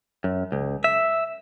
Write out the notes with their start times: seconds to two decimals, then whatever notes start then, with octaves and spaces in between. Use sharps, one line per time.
0.24 F#2
0.52 C#2
0.84 E5